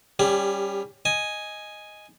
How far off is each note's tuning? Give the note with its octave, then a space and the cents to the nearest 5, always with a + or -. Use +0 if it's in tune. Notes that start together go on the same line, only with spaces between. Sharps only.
G3 +0 C#4 +0 G4 +30
D#5 +0 G#5 +0